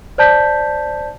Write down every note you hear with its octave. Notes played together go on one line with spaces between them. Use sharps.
C5 D5 A5 G6 B6